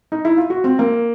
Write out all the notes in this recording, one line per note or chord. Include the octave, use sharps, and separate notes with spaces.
D#4
E4
F4
F#4
C4
A#3